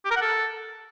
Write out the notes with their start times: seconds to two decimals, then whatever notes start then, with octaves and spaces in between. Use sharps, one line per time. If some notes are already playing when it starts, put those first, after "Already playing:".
0.05 G4
0.11 A#4
0.16 F#5
0.22 A4